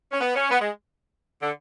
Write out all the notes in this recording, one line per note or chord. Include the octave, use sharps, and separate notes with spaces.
C#4
B3
C#4
B3
G#3
D3